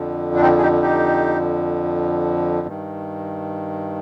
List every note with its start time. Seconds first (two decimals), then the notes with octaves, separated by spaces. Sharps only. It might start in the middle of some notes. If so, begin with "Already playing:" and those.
Already playing: F2 D3 F3
0.35 D4
0.42 C4 D#4
0.58 G#4
0.62 D#4 G4
0.83 D#4 G4
2.67 G2 D#3